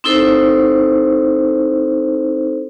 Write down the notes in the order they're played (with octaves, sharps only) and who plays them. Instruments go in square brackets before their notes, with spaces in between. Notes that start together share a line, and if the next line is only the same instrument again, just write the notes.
[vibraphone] C4 D#4 E4 A4 C5